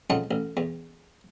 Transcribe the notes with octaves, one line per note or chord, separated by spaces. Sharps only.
F2 C#3 D#4 F4 F#5 A5
A1
E2